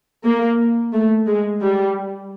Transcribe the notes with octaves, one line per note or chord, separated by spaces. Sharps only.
A#3
A3
G#3
G3